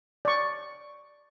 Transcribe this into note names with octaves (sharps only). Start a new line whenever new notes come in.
D5 C#6